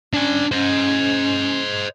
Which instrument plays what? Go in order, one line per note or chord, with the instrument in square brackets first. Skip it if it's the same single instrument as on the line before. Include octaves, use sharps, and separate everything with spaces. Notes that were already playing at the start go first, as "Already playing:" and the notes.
[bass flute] C#4 [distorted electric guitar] D4 G#5
[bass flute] C#4 [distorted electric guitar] C5 D#5